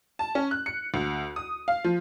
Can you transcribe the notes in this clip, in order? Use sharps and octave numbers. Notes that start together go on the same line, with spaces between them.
A5
C#4
F#6
C#7
D2
D#6
F5
F3